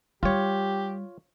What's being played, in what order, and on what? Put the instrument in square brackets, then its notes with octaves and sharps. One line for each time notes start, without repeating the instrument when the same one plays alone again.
[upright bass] G3 [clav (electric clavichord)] F4 C#5 [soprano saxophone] G4